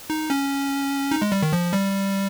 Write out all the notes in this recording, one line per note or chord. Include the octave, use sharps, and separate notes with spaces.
D#4
C#4
D#4
G#3
G3
D#3
F3
G3